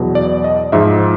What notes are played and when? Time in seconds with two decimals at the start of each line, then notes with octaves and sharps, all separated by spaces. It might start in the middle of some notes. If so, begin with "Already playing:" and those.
Already playing: E2 B2 F#3
0.15 D5
0.44 D#5
0.72 G#2 F3 E5